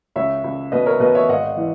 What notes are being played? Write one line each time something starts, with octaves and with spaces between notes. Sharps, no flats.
C#2 C#5 E5
C#2
B2 B4 D#5
A#4 C#5
B2 B4 D#5
C#5 E5
G#1 D#5 F#5
E3